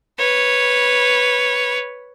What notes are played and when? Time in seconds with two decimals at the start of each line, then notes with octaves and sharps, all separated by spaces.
0.18 B4 C#5